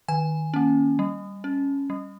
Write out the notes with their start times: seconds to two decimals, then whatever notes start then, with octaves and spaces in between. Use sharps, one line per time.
0.08 D#3 G#5
0.54 A#3 C#4
0.99 G3
1.44 C#4
1.90 G3